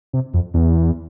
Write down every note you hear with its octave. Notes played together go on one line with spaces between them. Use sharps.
C3
F2
E2